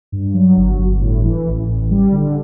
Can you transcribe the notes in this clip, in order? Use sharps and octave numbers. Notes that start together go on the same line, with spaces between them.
G2
F#3
G1
G1
A2
E3
A1
A1
G3
D3